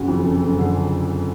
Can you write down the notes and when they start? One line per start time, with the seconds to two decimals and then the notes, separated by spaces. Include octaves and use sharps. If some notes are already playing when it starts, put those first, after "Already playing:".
Already playing: F#1 F#4
0.08 F2
0.24 F#1 A4
0.42 F#1
0.59 D3 G#4